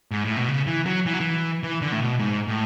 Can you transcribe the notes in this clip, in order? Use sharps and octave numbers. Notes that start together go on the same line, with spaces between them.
G#2
A2
B2
C#3
E3
F#3
E3
F#3
E3
E3
D3
A2
B2
G#2
A2